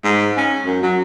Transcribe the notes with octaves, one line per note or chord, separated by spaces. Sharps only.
G#2
C#4
F#2
F#3